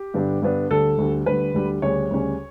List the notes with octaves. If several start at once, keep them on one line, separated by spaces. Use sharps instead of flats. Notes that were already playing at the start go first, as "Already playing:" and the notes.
Already playing: G4
G2 D3 G3 B3 D4
G2 D3 G3 B3 D4
D2 D3 G3 A4
D2 D3 G3
D2 D3 G3 B4
D2 D3 G3
D2 C#3 G3 C#4 C#5
D2 C#3 G3 C#4